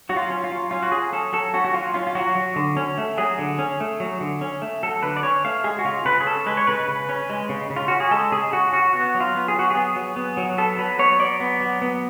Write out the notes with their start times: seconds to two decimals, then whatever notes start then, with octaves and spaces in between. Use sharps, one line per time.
0.09 F#3 F#4
0.16 F4
0.30 C#4
0.44 F4
0.51 F#3
0.71 C#4 F4
0.83 F#4
0.92 F#3 G#4
1.13 C#4 A4
1.33 F#3 A4
1.54 C#4 F#4
1.65 F#4
1.74 F#3 F4
1.94 C#4 F4
2.07 F4
2.15 F#3 F#4
2.35 F#3
2.56 D3
2.77 C#4
2.98 A3
3.18 F#3 G#4
3.39 D3
3.59 C#4
3.80 A3
4.00 F#3
4.21 D3
4.41 C#4
4.62 A3
4.83 F#3 A4
5.03 D3 B4
5.17 D5
5.23 C#4 C#5
5.44 A3 F5
5.64 G#3 G#4
5.79 F#4
5.85 C#3 F4
6.05 C#3 B4
6.20 G#4
6.26 C#4 A4
6.46 G#3 B4
6.57 C#5
6.67 C#3 B4
6.88 C#3
7.09 C#4
7.30 G#3
7.49 C#3
7.70 C#3
7.76 F4
7.88 C#4 F#4
8.00 G#4
8.11 G#3 A4
8.32 C#3 G#4
8.53 C#3 F#4
8.72 C#4 F#4
8.93 B3 F#4
9.15 F#3
9.20 F4
9.35 B3
9.48 G#4
9.55 F#3 F#4
9.70 B3 G#4
9.96 F#3
10.16 B3
10.37 F#3
10.58 B3 A4
10.78 F#3 B4
10.99 B3 C#5
11.19 F#3 D5
11.40 B3
11.60 F#3
11.82 B3